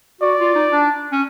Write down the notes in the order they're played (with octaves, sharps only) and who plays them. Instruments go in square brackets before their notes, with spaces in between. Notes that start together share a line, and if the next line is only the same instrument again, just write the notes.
[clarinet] F#4 [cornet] D5
[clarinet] F4
D#4
D4
C#4